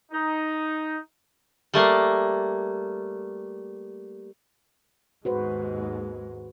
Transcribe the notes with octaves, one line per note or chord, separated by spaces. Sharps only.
D#4
G3 A3 A#3
D#2 G#2 G#3 F#4 B4 C5